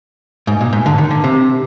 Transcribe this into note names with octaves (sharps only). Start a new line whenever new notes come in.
G#2
A#2
G#2
D3
D#3
D3
C3